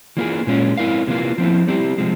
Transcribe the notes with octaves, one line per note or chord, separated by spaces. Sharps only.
E3 A#3 F4 G#4
A#2 G#3 C#4 F4
C4 E4 A#4 F5
C3 E3 A#3 F4
F3 C4 E4
G3 C4 E4 G4
C3 F3 G#3